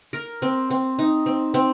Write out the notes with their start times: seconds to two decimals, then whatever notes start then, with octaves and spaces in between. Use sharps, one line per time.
0.13 A#4
0.42 C4
0.70 C4
0.99 D#4
1.26 C4
1.54 C4